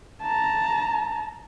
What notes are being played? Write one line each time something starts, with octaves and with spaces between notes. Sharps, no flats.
A5 A#5